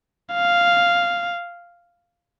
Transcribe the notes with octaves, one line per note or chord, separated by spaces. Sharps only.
F5